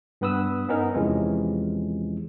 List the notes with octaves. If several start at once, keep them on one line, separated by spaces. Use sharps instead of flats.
G2 B3 B4 D#6 E6
B3 C#4 D#4 A#4
E2 C3 E3 F3 G#3 C#4